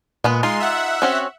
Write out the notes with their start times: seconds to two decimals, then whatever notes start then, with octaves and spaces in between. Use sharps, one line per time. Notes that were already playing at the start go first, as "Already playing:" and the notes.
0.24 A#2 G#3 B3 B4
0.43 G#3 D#4 F4 G#4 C6
0.60 E5 F#5
1.02 C4 C#4 F#4